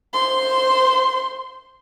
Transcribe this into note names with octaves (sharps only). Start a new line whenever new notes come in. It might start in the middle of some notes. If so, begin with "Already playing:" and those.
C5 C6